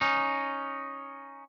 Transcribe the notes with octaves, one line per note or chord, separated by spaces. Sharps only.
C#4 D#4